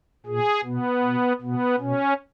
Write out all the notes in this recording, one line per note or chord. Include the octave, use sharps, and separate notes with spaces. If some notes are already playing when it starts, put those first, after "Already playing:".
A#2 G#4
B2 B3
B2
B2 B3
B2 C#4